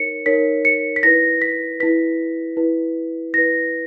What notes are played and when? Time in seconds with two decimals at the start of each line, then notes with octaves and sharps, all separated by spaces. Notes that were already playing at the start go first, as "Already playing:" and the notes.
Already playing: D#4 A#4 C#5 C#7
0.26 D#4 A#4 C#5 B6
0.65 C#7
0.96 B6
1.03 E4 B4 A#6
1.42 B6
1.80 E4 B4 B6
2.57 E4 B4
3.34 E4 B4 A#6